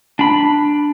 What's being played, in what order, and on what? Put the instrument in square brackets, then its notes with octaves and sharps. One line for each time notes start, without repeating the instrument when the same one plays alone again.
[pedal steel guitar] D4 B5